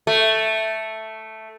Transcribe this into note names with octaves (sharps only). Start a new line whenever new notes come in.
A3